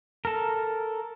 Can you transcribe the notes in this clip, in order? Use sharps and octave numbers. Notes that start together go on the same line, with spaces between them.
A4 A#4